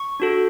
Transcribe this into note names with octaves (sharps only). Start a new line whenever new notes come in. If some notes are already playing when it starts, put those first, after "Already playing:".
Already playing: C#6
D4 F#4 A4